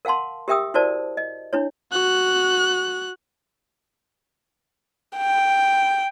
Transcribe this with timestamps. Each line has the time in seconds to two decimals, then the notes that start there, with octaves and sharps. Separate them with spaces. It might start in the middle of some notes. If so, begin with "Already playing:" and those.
0.05 A#4 F5 F#5 A5 C6
0.48 G4 A#4 E5 G5 D#6 E6
0.74 E4 F#4 A#4 C5 D5 A5
1.17 D#5
1.53 D4 E4 C#5
1.92 F#4 F#6
5.17 G5